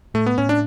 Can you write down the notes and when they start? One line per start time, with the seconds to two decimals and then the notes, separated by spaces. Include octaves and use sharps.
0.14 A2 A3
0.26 B3
0.38 A2 C#4
0.49 D4